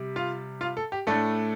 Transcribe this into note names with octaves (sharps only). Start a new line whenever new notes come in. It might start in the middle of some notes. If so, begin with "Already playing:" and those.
Already playing: C3 G3
F4 F5
F4 F5
A4
G4
A2 A3 D4 A4